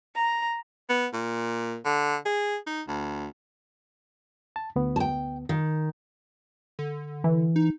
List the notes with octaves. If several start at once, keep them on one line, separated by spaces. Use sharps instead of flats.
A#5
B3
A#2
D3
G#4
D#4
D2
A5
D2 B3
G5 A5
D#3
D3
E3
D#4